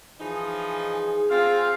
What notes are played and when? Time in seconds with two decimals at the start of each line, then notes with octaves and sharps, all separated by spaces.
0.21 E3 F3 D#4 G#4
1.30 C4 F4 F5